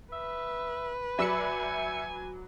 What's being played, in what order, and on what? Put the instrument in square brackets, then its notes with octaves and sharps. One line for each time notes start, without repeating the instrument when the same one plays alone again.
[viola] B4 [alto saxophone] E5
[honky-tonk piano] F#3 D5 B5 [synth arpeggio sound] E5 E6 C#7 [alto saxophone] G#5